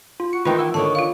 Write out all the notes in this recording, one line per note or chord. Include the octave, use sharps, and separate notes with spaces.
F4
F#4 C#7
D#3 E3 D#4 F4 B4 G5 B5
E4 F#5 E6
D3 D#3 B3 C#5 A5
F4 F5